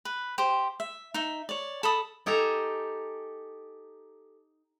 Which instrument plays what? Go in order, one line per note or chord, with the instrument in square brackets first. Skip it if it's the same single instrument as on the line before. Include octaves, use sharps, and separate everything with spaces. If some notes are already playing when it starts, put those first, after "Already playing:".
[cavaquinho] B4
G4 C5
E5
D#4 E5
C#5 D5
A4 A5 B5 D#6
[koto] D#4 G4 A4 G#5 A#5